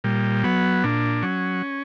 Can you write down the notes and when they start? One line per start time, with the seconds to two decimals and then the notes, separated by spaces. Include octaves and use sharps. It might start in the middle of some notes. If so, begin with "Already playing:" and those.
0.04 A#2 G3
0.44 F#3 B3
0.84 A#2 D4
1.23 F#3 C#4